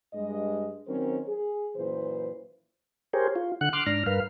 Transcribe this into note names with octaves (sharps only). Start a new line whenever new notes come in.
G2 G#3 D#5
D#3 F#3 C4 C#4 A#4 C5
G#4
F#2 A#2 E3 B4 C5
G4 G#4 A#4 C5 C#5
F4
D3 F#5 F#6
C6 D6 F6 F#6
G#2 D4 A#5 F6
G2 A#4 B4 F5 F6